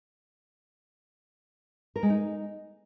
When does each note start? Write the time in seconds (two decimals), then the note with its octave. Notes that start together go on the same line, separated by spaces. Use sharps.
1.96 A#4
2.03 G#3
2.10 D#4